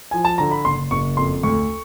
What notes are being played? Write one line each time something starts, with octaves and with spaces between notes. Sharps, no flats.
F3 G#5
A5
D3 A#5
B5
F#1 C6
F#1 C#6
F2 C6
D2 C#6